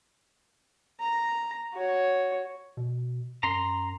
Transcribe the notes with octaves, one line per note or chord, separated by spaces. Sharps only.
A#5
F#4 C#5
B2
F#2 A#5 C6